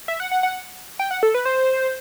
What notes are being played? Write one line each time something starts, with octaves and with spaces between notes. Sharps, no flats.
E5
F#5
F#5
F#5
G5
F#5
A4
B4
C5